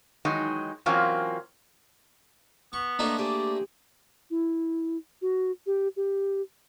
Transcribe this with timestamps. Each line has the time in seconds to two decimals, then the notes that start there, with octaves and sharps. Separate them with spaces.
0.25 D#3 E3 F#3 G#3 D#4
0.86 E3 F#3 A#3 C4 C#4 F4
2.73 B3 C#6
2.99 A3 A#3 D4 D#4 C5
3.19 G4 G#4 C5 D5
4.30 E4
5.22 F#4
5.66 G4
5.97 G4